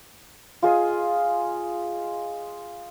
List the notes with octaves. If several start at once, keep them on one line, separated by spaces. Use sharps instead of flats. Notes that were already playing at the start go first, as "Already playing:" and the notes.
F4 G#4 D#5